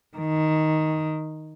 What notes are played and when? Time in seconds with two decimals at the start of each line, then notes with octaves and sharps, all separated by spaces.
0.18 D#3